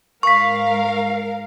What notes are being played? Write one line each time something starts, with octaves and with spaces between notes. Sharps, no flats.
G#2 A#4 F5 C#6 B6